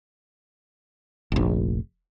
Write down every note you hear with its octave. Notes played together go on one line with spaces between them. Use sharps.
F1 A#1